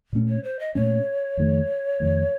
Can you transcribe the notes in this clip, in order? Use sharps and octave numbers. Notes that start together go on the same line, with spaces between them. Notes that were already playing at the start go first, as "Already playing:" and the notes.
A#2 A3 C#4
C#5
C5
D#5
A#2 A3 C#4 C#5
F2 D#3 A3
F2 D#3 A3